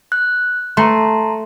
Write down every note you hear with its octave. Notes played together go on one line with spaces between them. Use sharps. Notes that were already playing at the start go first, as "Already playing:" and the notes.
F#6
A3 A5 A#5 C6